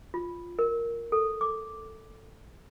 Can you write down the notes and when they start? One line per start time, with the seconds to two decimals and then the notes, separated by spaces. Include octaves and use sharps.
0.14 F4
0.59 A#4
1.12 A4
1.41 D6